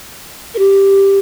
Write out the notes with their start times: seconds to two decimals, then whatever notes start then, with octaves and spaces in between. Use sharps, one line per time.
0.54 A#4
0.59 G4